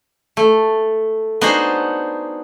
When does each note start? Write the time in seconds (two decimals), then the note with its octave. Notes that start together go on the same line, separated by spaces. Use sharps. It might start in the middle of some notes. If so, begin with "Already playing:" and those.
0.37 A3
1.41 B3 D4 D#4 F#4 G#4 C5